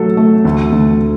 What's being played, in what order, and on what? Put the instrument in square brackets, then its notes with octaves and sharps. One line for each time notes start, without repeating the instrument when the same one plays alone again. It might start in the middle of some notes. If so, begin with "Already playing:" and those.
Already playing: [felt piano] F#3 A3 [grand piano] A4
[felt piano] A3
D2
D2